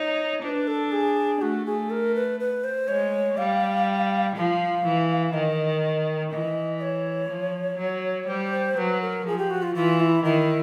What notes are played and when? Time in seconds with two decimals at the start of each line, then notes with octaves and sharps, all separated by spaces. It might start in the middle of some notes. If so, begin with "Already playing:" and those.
Already playing: D#4 C#5
0.43 D4 C5
0.48 B4
0.68 A4
0.92 G#4
1.41 A3 F#4
1.66 G#4
1.90 A#4
2.15 B4
2.40 B4
2.64 C5
2.88 G#3 C#5
3.38 G3 F5
4.35 F3 F5
4.85 E3
5.34 D#3 D#5
6.31 E3 D#5
6.81 C#5
7.29 F3
7.78 F#3
8.28 G3 C5
8.77 F#3 B4
9.02 A#4
9.25 F3 G#4
9.38 G4
9.51 F#4
9.62 F4
9.75 E3 F4
10.00 E4
10.24 D#3 E4